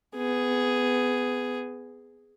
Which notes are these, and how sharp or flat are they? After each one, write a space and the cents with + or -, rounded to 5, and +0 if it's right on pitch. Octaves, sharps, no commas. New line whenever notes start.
B3 +20 G#4 +0